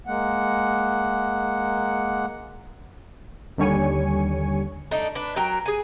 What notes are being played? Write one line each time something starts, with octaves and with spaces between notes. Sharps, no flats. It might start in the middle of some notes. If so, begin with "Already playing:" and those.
G#3 A#3 F#5
D#2 D3 G3 C#5 G#5 C#7
A3 D4 D#4
D4 B4
F#3 A#4 G5
G#4 G#5